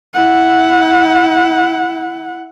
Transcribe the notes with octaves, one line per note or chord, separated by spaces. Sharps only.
E4 F#5